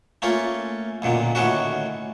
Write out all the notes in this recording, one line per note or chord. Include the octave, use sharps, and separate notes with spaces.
A3 A#3 C#4 F4
B1 F#2 A#2 D3
A2 D3 D#3 C#4 F#4